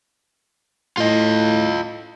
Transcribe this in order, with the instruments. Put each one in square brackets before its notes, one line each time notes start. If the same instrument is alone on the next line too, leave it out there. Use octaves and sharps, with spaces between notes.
[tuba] A2 [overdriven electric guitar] F4 D#5